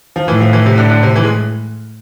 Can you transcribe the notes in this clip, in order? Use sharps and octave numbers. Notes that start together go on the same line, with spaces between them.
F3
A2 E3
F3
E3
C3
D3
D3
C3
E3
G#3